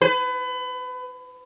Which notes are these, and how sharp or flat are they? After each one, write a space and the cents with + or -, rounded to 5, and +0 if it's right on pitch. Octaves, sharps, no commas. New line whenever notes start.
B4 +30